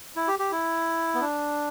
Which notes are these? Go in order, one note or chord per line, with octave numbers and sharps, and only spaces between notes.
E4
G4
G4
E4
B3
D4